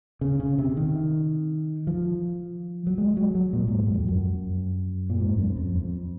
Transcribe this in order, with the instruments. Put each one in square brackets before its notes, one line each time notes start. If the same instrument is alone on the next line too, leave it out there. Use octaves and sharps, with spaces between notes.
[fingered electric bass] C#3
C#3
C3
D#3
F3
F#3
G#3
F#3
F#3
A#2
G#2
F#2
F2
F#2
A#2
G#2
F#2
F2
F2